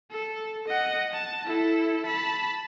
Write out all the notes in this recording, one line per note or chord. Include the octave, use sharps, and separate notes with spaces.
A4
D#5 F#5
A5
E4 A4
A5 B5